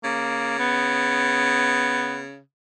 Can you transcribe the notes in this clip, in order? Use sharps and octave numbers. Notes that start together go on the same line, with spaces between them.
C#3 A#3
B3